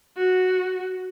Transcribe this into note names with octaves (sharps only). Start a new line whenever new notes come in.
F#4